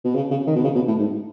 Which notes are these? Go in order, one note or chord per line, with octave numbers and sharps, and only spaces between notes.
B2
C#3
C#3
D#3
B2
C#3
B2
A2
G#2